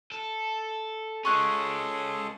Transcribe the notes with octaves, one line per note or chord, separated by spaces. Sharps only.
A4
G#3 C#4 G#4 A4 C6 C#6 F#6